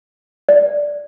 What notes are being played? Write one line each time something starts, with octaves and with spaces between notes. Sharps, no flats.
D5